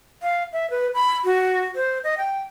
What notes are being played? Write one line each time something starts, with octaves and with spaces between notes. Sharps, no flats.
F5
E5
B4
B5
F#4
C5
D#5
G5